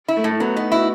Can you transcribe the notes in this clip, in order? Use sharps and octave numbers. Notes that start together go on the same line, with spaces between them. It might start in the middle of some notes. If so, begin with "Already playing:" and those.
E4
A3
A2
A3
F#3 B3
B3 D#4
E4 F#4